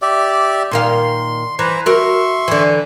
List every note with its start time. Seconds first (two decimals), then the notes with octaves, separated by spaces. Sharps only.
0.02 G4 D5 E5
0.71 A#2 D#3 F5 C6
1.59 E3 B4 C5 A#5
1.86 F#4 A#4 E5 C6 C#6
2.48 D3 E3